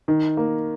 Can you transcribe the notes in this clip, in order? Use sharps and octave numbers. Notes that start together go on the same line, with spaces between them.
D#3
A#3